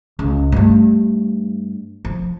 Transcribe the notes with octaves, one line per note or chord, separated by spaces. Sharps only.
C#2
G2 A3
F3